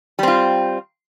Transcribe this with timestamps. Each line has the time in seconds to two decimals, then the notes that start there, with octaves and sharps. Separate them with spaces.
0.19 G3
0.23 C4
0.28 F4